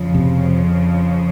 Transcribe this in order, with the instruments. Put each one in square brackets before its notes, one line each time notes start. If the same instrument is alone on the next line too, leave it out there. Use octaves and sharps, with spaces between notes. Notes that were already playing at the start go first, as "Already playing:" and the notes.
Already playing: [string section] F2 C#3 F3
[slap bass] C3